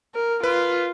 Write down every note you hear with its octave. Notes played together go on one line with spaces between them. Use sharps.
A#4
F4 B4